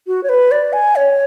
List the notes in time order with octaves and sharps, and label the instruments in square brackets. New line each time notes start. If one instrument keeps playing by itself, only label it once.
[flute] F#4
C#5
B4
D5
G#5
C#5